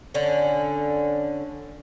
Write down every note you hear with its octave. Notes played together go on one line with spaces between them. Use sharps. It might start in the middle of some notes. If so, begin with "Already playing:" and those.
D3 C#4